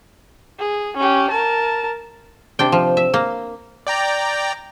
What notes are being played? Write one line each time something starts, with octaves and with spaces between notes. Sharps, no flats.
G#4
C#4 G4
A#4 A5
C3 D4 G5
F3
E5
A#3
D5 G5 A#5